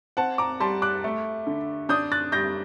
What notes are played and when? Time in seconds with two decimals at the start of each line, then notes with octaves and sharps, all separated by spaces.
0.17 C4 F#5 A5
0.38 A#5 D6
0.60 G3 A5 C6
0.82 D6 F#6
1.04 A3
1.47 D3
1.89 D4 D#6 G6
2.12 F#6 A6
2.32 G3 G6 A#6